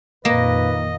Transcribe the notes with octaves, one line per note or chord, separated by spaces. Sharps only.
F2 A#2 D#3 A#3 B4 D#5